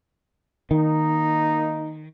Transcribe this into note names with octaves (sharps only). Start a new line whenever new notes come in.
D#3 A#3 D#4